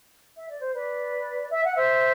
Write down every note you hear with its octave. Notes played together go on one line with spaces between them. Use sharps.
E5
D5
C5
B4 D5
E5
F#5
C5 E5